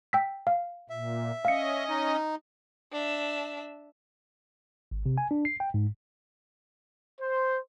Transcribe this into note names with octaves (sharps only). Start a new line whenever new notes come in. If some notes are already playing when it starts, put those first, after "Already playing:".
G5 E6 B6
F5
A#2 E5
C#4 D#5 F5 C#7
D#4
D4 E5
G#1
C3
G#5
D4
C7
G5
G#2
C5